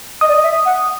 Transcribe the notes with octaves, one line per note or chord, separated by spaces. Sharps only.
D#5 D#6
D5
D#5
E5
F#5